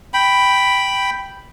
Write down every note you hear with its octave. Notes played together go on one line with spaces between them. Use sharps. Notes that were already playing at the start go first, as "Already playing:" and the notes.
G5 B5